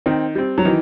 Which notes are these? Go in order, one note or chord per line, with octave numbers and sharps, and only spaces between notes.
D#3 C4
G3 C4
F#3
D#3 E3